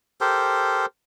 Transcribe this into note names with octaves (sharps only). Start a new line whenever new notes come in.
G4 A4 A#4 C5